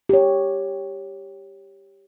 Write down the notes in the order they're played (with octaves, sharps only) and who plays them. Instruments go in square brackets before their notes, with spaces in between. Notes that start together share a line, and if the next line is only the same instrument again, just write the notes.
[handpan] G4 C#5